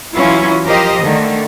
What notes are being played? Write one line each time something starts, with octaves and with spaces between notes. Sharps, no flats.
E3 F#3 C#4 E4 F4
F3 G4 A#4 C5 D#5
D3 D#3 A3